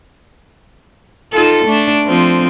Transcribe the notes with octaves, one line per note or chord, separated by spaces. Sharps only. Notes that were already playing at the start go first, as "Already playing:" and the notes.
D#4 F4 A4
A3 D4
F3 C4